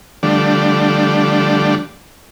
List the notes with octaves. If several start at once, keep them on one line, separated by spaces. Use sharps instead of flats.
D3 F3 G3 A3 D4